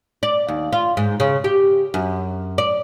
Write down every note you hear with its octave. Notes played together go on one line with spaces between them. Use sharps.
D5
D#2
F4
G#2
C#3
G4
F#2
D5